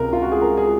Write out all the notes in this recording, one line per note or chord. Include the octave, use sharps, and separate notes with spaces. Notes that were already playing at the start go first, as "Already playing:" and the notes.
Already playing: C#2 C3 A#4
F4
F#4
G#4
A#4
G#4